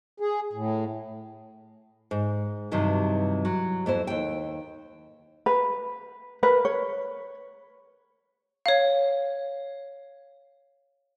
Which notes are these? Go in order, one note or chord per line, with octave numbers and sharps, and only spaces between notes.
G#4
A2
G#2
G2 C3 D#3 E3 F#3
F#3
F2 B3 E4 C5
D#2 G5
B4
A#4 B4
C#5
C#5 F5